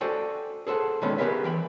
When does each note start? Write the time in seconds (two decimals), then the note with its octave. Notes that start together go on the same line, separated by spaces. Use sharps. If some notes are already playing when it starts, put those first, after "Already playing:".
0.01 F#4 A4 C5 D5 G5 G#5
0.67 G#4 A4 C5 F#5
1.02 B2 D3 D#3 G#3 B3 C#4
1.18 B3 G4 G#4 A#4 B4 E5
1.44 E3 G5 B5